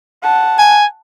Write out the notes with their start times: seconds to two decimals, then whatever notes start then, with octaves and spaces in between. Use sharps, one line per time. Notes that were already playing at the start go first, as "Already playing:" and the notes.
0.23 F#5 A5
0.59 G#5